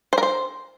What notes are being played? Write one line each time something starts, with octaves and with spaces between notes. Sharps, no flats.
C5
A#4
C5